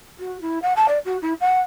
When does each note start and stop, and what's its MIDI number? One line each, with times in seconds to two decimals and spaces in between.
0.19 0.38 66
0.41 0.59 64
0.62 0.73 78
0.76 0.86 81
0.88 0.99 74
1.05 1.18 66
1.22 1.33 64
1.41 1.59 78